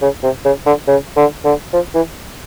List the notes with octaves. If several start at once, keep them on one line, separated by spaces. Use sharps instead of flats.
C#3
C3
C#3
D3
C#3
D3
D3
F3
E3